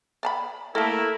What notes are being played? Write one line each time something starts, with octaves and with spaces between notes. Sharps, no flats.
D5 A5 B5
A3 A#3 E4 A4 A#4